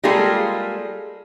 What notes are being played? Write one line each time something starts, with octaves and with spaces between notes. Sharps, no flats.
G3 G#3 A#3 F4 G#4 A4